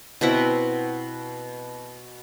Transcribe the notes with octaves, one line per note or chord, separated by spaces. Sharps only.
B2 C4 E4 F#5